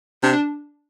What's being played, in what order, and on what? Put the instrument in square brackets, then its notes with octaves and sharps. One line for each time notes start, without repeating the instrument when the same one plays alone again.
[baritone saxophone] C3 [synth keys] D4
[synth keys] D4